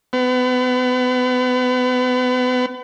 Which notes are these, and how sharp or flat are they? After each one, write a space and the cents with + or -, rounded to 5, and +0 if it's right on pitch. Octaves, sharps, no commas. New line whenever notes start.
B3 +30